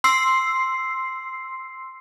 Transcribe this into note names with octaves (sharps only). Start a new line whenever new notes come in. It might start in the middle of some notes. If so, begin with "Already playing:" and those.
C6 E6 C7